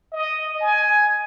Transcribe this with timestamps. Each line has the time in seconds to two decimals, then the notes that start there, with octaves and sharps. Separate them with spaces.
0.13 D#5
0.61 G#5